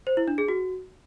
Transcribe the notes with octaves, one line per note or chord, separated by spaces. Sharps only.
C5
E4
D4
G#4
F#4